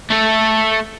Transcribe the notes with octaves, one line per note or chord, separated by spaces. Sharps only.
A3 A4